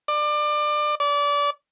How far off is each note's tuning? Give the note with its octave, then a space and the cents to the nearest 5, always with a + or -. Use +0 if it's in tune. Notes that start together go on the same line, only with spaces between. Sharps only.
D5 +25
D5 -30